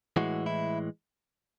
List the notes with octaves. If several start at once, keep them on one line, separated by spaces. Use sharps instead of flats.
A2 E3 G#3 F#4
E4